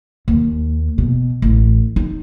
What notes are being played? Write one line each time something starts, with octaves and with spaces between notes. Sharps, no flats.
D#2
B2
A1
D#4